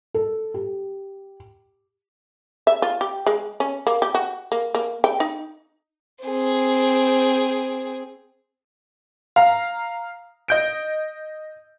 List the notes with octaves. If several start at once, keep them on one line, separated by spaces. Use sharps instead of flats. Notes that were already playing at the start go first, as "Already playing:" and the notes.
A4
G4
E5
F4
G4
G#3
C#4
A#3
G4
F#4
A#3
A#3
G5
D#4
C4 G#4
F5 A#5
D#5 G6 D7